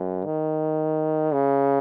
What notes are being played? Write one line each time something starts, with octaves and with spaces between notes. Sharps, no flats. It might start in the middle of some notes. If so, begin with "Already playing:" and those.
Already playing: F#2
D#3
C#3